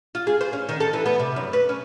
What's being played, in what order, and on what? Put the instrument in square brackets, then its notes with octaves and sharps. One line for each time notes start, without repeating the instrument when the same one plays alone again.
[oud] F4
G#4
C5
C#4
D#3
A4
E3
B3
C3
F#2
B4
C#4